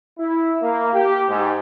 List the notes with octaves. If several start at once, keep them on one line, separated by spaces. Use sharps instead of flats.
E4
A#3
G4
G#2